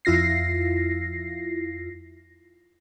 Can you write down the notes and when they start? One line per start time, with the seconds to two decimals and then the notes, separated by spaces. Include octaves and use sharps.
0.05 F2 E4 F4 A#6 C7